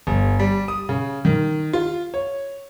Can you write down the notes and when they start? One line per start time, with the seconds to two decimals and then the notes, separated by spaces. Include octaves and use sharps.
0.07 G1
0.39 G3
0.68 D#6
0.89 C#3
1.25 D#3
1.73 F4
2.14 C#5